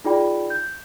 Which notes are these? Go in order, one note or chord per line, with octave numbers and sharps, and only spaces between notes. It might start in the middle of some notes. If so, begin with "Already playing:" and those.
D#4 F4 G#4 D5 G5 B5
G6